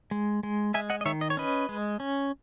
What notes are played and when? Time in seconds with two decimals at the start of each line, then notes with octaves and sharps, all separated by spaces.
0.11 G#3
0.43 G#3
0.74 G#3 E5 G#5
0.90 D#5 F#5
1.01 D#5
1.05 D#3 C#5 E5
1.21 D#5
1.30 C#5
1.37 C#4 B4 D#5
1.69 G#3
2.00 C#4